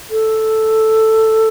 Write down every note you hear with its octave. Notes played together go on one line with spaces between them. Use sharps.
A4